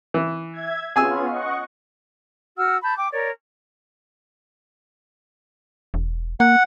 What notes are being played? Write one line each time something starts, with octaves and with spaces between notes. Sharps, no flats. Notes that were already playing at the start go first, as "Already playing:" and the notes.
E3
E5 G#6
B3 C#4 F4 G#4 G#5 E6
D#5 F#5 C#6
F#4 F#5 E6 F6
A5 B5 G6
G5 D6
A#4 C#5 D5
E1
A#3 F#5